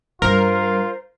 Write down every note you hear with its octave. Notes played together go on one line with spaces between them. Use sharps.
G2 G3 F4 A#4 C5